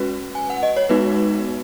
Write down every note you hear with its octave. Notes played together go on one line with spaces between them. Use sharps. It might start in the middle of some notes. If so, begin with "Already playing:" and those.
Already playing: G#3 C#4 F#4 B4
G#5
F#5
D#5
C#5
G#3 B3 D#4 F#4 B4